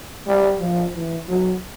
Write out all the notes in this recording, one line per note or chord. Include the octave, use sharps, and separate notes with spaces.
G3
F3
E3
F#3